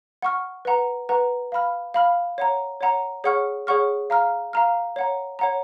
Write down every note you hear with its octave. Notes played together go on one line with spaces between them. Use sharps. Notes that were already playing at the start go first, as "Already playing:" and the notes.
F#5 C#6 F6
B4 F#5 A#5
B4 F#5 A#5
F5 B5 F6
F5 B5 F6
C#5 F#5 A#5
C#5 F#5 A#5
G#4 C#5 F#5 C#6 F6
G#4 C#5 F#5 C#6 F6
F5 A#5 F6
F5 A#5 F6
C#5 F#5 A#5
C#5 F#5 A#5